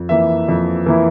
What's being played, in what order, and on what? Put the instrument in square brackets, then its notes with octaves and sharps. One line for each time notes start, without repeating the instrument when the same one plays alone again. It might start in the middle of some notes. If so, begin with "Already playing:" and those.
Already playing: [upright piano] F2
E3 A#3 E4 E5
F2
E3 A#3 E4